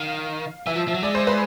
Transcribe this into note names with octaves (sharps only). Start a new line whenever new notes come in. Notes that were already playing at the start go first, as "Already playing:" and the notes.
Already playing: D#3 F5
E3 E5
F3
F3
F#3
G#3 D5
C5
B4